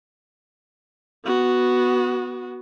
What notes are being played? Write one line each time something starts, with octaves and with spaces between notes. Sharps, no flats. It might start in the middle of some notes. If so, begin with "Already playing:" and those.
B3 F#4